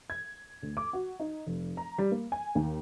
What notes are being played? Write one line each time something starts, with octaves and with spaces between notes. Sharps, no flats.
G#6
D2
D6
F#4
D#4
F1
A#5
G3
A#3
G#5
D#2